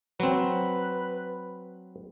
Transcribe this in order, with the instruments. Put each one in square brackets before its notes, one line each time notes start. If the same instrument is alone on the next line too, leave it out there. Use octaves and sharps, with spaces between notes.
[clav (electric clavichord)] F#3 C4 [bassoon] B4